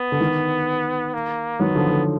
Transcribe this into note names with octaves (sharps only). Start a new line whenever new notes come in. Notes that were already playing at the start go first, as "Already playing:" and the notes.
Already playing: B3
D3
D#3
A#3
D#3 F#3 B3
D3 F3
D3